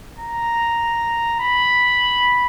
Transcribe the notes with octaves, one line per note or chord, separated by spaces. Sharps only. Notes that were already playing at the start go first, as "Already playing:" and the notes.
A#5
B5